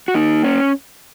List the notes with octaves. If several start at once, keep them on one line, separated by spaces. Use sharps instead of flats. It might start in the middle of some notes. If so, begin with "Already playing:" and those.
F#4
A#3 D#4
C#4